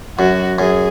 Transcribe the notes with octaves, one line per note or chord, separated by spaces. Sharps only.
F#2 F#4
F#2 G#4